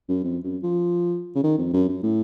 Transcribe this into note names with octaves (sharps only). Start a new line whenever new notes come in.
F#2
F2
F#2
F3
C#3
D#3
F2
F#2
F#2
A2